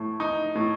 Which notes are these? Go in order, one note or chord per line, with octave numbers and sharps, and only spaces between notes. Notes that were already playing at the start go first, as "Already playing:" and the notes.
Already playing: A2 A3
D#4
A2